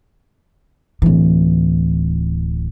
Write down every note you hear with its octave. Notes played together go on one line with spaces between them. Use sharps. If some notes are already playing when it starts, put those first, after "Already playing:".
D1 E3